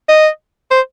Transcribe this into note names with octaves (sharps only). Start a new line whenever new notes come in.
D#5
C5